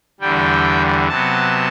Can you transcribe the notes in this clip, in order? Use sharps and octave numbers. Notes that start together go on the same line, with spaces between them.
E2 D3 G3 G5
C3 F#3 B3 A5